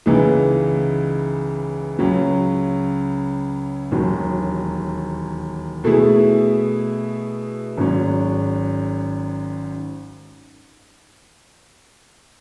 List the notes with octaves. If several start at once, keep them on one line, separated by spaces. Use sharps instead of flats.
C#2 C#3 E3 G#3 D#4
C#2 C#3 F#3 C#4
E1 D#2 D#3 F#3
B2 A3 E4 G#4
G#1 G#2 F#3 C#4